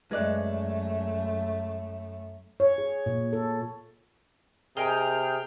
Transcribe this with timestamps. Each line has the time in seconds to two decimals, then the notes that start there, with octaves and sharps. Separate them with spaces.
0.11 F#2 G#3 A3 B4 D5 D#5 F#6
2.60 C#5
2.78 G#4
3.06 A#2
3.33 A4
4.77 C3 G#4 A#4 D#5 G5 G#5 F6